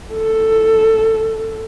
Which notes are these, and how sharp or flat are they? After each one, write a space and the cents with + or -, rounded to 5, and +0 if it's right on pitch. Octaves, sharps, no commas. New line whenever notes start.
A4 +10